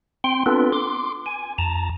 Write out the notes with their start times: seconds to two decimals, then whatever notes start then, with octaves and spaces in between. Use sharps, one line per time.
0.24 C4 G5 C6
0.46 B3 C4 D4 F4 A4 B4
0.73 C6 D6
1.26 G#5
1.58 F2 A5 A#5